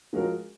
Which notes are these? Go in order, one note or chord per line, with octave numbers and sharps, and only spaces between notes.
F3 G#3 C#4 F#4 A#4